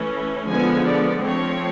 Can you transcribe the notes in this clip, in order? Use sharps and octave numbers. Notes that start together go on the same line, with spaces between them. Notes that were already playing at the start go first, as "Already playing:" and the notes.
Already playing: E3 A3 C#4
D3 F3 G#3 B3 G#5
D5
F3 A3 C4 C#5